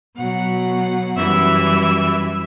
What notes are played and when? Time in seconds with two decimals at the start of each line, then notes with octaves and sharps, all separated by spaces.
0.15 B2 F#3 F#5
1.15 F#2 E3 G3 E5